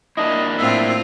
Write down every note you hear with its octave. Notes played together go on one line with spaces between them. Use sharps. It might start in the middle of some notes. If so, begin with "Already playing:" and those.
A#3 D4 E4 D#5
A2 C4 F4 E5